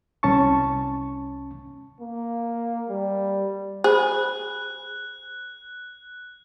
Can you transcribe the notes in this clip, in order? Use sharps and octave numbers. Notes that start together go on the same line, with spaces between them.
C2 C#4 A5 C#6
A#3
G3
G#4 C5 B5 F#6